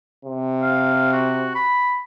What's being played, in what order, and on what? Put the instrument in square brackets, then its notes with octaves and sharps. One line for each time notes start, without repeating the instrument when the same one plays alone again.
[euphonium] C3
[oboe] F5
F#4
B5